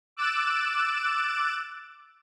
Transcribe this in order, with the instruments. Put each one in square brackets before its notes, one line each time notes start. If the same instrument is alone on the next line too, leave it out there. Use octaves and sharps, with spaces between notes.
[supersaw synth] D6 E6 F#6 A6 D7 E7